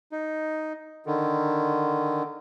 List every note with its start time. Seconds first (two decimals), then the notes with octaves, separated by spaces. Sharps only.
0.12 D#4
1.06 D3 D#3